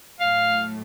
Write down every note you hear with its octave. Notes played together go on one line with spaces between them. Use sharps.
A2 F#3 A3 F5